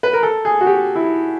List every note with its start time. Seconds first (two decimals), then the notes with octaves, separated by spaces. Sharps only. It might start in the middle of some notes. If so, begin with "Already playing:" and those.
0.03 B4
0.13 A#4
0.23 A4
0.45 G#4
0.61 F#4
0.66 G4
0.96 E4